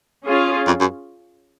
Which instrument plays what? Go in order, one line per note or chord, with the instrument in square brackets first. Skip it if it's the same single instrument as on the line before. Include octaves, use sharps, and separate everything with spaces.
[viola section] C#4 F4 G#4
[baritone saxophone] F2
F#2